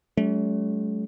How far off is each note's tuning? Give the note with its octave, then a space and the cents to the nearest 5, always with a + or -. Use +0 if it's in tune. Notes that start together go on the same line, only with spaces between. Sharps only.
F#3 +35 A3 -40 C#4 +40